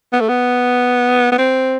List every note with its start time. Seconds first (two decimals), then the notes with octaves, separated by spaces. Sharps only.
0.13 B3
0.20 A3
0.29 B3
1.32 B3
1.38 C4